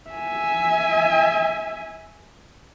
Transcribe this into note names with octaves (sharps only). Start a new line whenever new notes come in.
E5 G#5